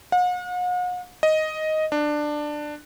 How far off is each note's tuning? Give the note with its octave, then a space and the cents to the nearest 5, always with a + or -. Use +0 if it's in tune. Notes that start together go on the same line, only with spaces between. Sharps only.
F#5 -45
D#5 +5
D4 +15